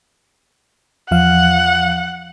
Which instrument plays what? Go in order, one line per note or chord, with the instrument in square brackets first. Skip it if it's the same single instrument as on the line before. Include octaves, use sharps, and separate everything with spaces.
[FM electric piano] E2 F3 F5 [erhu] F#5